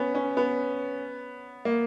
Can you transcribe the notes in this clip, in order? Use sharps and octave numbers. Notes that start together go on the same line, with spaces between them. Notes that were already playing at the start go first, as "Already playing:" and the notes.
Already playing: B3 C#4
C#4
B3
A#3